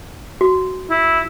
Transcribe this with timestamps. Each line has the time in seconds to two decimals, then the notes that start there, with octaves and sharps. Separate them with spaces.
0.41 F#4
0.90 E4